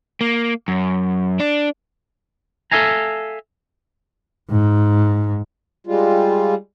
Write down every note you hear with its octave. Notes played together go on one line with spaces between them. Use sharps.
A#3
F#2
D4
A4 A#4 E5 F5 G#5 A#5
G#2
G3 G#3 F4